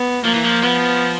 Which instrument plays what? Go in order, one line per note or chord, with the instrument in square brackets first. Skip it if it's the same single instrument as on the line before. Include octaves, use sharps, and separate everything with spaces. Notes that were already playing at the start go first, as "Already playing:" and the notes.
Already playing: [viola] B3
[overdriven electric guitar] F3 [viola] A#3
[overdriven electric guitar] E3
F3
[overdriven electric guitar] F3 [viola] B3